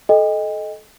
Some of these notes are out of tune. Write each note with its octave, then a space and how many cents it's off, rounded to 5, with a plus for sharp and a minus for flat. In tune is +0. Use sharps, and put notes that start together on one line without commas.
A4 -25 D#5 +0 G5 +40